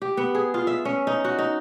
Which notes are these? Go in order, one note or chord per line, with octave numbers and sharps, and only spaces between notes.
G4
B3
G#4
F4
E5
C#4
D#4
F#4
D#4